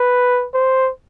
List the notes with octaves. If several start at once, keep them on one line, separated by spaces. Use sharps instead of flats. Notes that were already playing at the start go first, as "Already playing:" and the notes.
Already playing: B4
C5